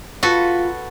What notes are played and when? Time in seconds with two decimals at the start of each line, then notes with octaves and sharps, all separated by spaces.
0.23 F4 F#4 A4 B4